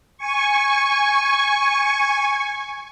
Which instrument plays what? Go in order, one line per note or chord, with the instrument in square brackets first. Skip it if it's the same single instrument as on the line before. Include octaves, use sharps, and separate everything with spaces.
[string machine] G#5 C#6